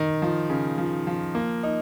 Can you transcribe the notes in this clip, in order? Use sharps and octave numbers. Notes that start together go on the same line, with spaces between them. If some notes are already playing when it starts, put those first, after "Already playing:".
Already playing: D#3
F3
C#3
F3
F3
A#3
D#4